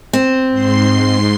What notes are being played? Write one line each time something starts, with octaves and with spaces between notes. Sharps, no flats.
C4
G#2 C6 C7